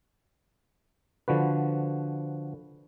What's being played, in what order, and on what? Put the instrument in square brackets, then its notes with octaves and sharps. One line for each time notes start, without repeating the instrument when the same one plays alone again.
[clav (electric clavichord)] D3 F3 F#4 B4